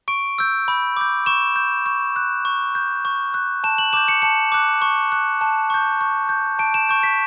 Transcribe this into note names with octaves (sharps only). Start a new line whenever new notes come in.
C#6 D7
E6 G6
B5
D6 G6
C#6 E7
G6
C#6
F#6
C#6
G6
C#6
F#6
A5 E7
F#7
D6 G6 E7
C#7
A5 C#7
D6 F#6
C#6
F#6
A5
C#6 G6
C#6
G6
A5 D7
E7
C#6 G6
B6